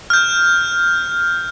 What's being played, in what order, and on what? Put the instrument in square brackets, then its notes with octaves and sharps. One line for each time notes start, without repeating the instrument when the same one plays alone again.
[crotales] F6 G6